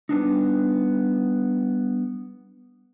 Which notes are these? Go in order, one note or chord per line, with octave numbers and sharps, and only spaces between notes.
G3 B3 D4 D#4